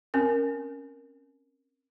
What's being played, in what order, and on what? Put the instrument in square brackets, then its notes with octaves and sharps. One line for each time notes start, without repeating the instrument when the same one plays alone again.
[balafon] C4 C#4 A#4